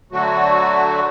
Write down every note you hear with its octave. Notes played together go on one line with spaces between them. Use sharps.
D3 F#3 A3 F#4